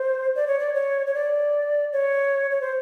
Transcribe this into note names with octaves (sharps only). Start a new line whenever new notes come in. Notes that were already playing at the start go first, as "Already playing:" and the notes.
Already playing: C5
D5
C#5
D5
C#5
C#5
D5
C#5
C#5
C5